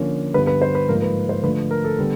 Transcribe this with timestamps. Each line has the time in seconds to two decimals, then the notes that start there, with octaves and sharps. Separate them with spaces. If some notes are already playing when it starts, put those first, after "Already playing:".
Already playing: D3 F3 A#3 C#4
0.34 G2 D3 G3 B3 B4
0.47 B4
0.62 C5
0.75 B4
0.88 G#2 F3 A#3 A#4
1.02 B4
1.29 C5
1.43 D3 F3 A3 B4
1.71 A#4
1.84 A4
1.98 D3 G3 B3